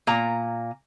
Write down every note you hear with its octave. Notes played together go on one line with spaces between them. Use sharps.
A#2 A#5